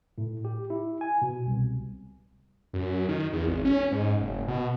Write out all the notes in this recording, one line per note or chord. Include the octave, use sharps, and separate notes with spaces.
A2
G4
E4
G#5
B2
C2
F#2
D#3
E2
G#1
C#4
G#2
F#1
B2